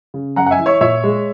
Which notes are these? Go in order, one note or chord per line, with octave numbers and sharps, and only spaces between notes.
C#3
F#2 F#5 A#5
F#5
E5 G#5
E3
C#5 E5
A#2 C#5 E5
G#3